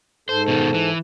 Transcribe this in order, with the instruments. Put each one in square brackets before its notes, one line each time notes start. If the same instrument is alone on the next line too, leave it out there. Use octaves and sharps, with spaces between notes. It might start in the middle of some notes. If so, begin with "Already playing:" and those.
[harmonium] G#2 A4 [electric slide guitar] C5
[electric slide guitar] B2 D#3
E3